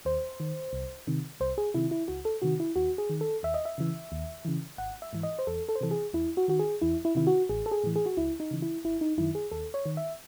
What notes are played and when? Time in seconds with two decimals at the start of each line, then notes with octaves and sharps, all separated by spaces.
0.05 D#2 C5
0.40 D#3
0.73 C2
1.07 C3 D#3
1.40 C2 C5
1.58 G#4
1.74 C3 D#3 E4
1.91 E4
2.08 C#2 F#4
2.25 A4
2.42 C3 D#3 F#4
2.60 E4
2.76 D#2 F#4
2.98 G#4
3.10 D#3
3.21 A4
3.43 D#2 E5
3.54 D#5
3.65 E5
3.78 C#3 E3
4.12 D#2
4.45 C#3 E3
4.78 G#1 F#5
5.02 E5
5.13 G#2 E3
5.23 D#5
5.39 C5
5.47 E2 A4
5.69 A4
5.75 C5
5.81 C3 E3 A4
5.91 G#4
6.13 E2 E4
6.37 F#4
6.48 D#3 F#4
6.59 G#4
6.81 E2 E4
7.05 E4
7.15 C3 D#3 E4
7.27 F#4
7.49 A1 G#4
7.66 A4
7.71 G#4
7.84 A2 E3
7.96 G#4
8.06 F#4
8.17 C#2 E4
8.40 D#4
8.51 C#3 E3
8.62 E4
8.84 G#1 E4
9.01 D#4
9.18 F#2 D#3 E4
9.35 G#4
9.51 D#2 A4
9.74 C#5
9.86 D#3
9.97 E5